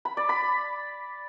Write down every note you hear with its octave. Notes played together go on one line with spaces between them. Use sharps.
B5
D5
B5